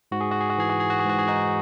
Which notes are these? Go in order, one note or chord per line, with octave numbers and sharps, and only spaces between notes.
G#2 F#4
G#4
F#4
G#4
F#4
E3 G#4
F#4
G#4
F#4
G#4
G#2 F#4
G#4
D#4 F#4